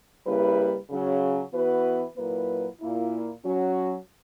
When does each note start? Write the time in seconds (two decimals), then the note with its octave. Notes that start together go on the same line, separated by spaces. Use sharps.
0.26 C#3 G3 A#3 E4 B4
0.89 C#3 F#3 C#4
1.53 E3 B3 F#4 B4
2.17 A#2 F#3 A#3 E4 B4
2.80 A#2 A#3 E4
3.44 F#3 C#4 F#4